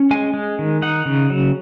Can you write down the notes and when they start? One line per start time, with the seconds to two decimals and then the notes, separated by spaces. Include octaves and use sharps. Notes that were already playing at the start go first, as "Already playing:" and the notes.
Already playing: C#4
0.11 G#3 G#5
0.34 G#3
0.59 D#3
0.82 D#4 F#5
1.06 C#3
1.30 F#3